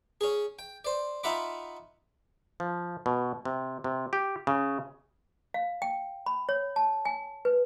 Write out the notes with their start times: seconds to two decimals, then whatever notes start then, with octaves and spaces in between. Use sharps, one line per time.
0.21 C#4 G#4
0.59 G5
0.85 C5 D5
1.24 D#4 F4 E5 F#5 B5 D6
2.60 F3
3.06 B2
3.45 C3
3.84 C3
4.13 G4
4.47 C#3
5.54 F5
5.82 G5
6.26 B5
6.49 C#5
6.76 A5
7.05 G#5
7.45 B4